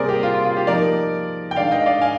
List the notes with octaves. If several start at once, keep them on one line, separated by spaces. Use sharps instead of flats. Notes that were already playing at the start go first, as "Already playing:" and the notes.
Already playing: C3 G3 A#3 G#4 A#4 C5 D5
G4
F4
F4
F4
G4
F3 A#3 D#4 A#4 D5
G5
D#3 G#3 D4 D5 F5
F5
D#5 G5
D5 F5
F5 G#5